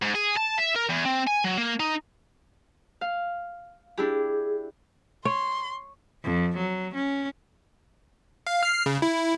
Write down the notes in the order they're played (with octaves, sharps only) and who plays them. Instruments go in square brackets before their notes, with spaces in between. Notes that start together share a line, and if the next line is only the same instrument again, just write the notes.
[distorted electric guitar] G#2
G#4
A5
E5
A#4
E2
C4
G#5
F#3
A#3
D#4
[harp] F5
[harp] D4 E4 G4 [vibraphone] G#4
[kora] C#5 [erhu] C6
[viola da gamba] F2
F#3
C#4
[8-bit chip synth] F5
F6 C7
C#3
E4